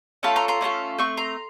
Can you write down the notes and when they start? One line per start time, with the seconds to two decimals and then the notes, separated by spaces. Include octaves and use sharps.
0.23 A3 C#4 F4 A4 A5 B5
0.36 A#5 C6
0.48 A#5 C6
0.61 A3 C#4 F4 A4
0.98 A3 C4 C#6
1.17 A#5 C6